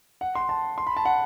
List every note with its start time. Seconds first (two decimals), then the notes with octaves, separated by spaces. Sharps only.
0.21 F#5
0.35 C6
0.49 A5
0.78 C6
0.87 B5
0.97 A5
1.05 F#5